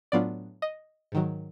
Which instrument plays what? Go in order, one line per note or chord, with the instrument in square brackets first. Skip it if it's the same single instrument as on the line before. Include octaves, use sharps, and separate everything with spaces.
[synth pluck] A2 F#3 B3 D4 F4 D5
D#5
G#2 D#3 F#3